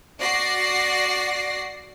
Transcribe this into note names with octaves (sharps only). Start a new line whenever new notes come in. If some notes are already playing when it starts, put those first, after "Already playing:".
F#4 D5 A#6 C7